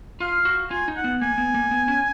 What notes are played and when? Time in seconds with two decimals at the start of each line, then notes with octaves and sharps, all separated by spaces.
0.20 F4 F5
0.45 F#4
0.71 F4 G#5
0.88 D#4
0.96 F#5
1.04 B3
1.22 A#3 G#5
1.38 B3
1.54 A#3
1.71 B3
1.88 C#4